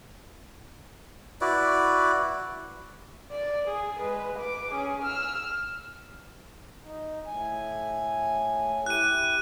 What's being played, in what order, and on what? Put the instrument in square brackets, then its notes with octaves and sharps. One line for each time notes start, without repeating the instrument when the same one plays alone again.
[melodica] E4 F#4 B4 D5
[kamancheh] D5
G#4
G#3 B4
B4 D6
C#4 G#4
E6 F6
[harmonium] D#4
A2 G#5
[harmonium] E4 G4 [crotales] F#6 D#7